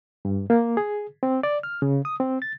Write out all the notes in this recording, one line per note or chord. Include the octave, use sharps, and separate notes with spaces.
G2
A#3
G#4
C4
D5
F6
C#3
D#6
C4
A6